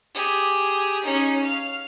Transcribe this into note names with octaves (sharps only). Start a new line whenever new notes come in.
G4 G#4
C#4 D#4
F5